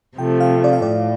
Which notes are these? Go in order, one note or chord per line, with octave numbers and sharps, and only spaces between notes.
C3 F3 A3 G5
F5
D5
F5
A2 D5